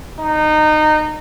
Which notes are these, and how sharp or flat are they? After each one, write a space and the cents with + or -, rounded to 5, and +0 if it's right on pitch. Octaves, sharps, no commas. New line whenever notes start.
D#4 -20